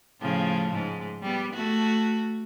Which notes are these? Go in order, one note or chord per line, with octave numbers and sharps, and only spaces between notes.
A2 C#3 F3
G#2
G3 B3
A3 F#4